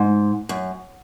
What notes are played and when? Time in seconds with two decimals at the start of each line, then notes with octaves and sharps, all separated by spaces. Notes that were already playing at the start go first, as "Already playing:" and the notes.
Already playing: G#2
0.49 F#2